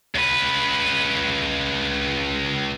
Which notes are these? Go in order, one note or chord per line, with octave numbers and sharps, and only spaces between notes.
C#2 B4